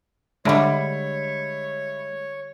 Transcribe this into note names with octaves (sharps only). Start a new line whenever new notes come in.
D3 G3 G#3 C#5 E5 B5